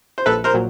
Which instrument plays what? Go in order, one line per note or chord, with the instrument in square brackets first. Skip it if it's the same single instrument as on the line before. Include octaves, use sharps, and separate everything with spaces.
[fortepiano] C5
[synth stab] A#1 [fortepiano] A4 B4
[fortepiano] A#4 C5
[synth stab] A#2 F#3